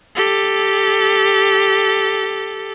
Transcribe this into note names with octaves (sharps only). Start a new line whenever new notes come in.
G4 A4